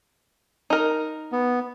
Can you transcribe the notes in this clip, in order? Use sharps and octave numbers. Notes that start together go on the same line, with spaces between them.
D#4 A#4
B3